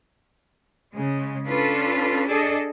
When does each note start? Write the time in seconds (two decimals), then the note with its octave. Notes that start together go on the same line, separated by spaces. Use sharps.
0.95 C#3 G#3
1.47 C#4 D4 F4 A4 B4
2.28 D4 G#4 A4 D5 D#5